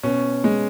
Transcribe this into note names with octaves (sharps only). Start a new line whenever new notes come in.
B2 C#4
G#3